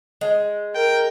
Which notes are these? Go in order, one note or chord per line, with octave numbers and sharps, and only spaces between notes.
G#3
A#4 G5